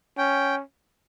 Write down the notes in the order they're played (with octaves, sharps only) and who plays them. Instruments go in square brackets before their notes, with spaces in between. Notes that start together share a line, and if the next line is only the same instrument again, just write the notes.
[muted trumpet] C#4 [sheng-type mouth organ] G5